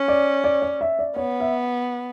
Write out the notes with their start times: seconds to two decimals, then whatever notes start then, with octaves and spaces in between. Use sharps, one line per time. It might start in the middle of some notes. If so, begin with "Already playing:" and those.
Already playing: C#4
0.08 D5
0.44 D5
0.62 D5
0.81 E5
0.99 D5
1.16 B3 C#5
1.40 E5